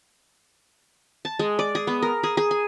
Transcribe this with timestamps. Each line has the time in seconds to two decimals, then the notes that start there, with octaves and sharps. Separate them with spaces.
1.25 A5
1.39 G#3
1.59 D5
1.75 G#4
1.87 B3
2.02 A#4
2.23 G#4
2.37 G#4
2.51 G#5